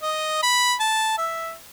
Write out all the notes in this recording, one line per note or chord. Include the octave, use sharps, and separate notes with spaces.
D#5
B5
A5
E5